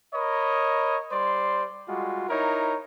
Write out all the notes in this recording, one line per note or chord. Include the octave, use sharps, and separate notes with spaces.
A#4 C#5 D#5 B5
G3 C5 D5 C6
G3 G#3 F4 F#4
D#4 E4 A#4 C#5